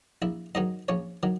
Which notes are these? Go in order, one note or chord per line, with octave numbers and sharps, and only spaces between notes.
A#1 E4 E5
G#2 D#3 F#3 D#4 D#5
A#1 C#4 C#5
D#3 F#3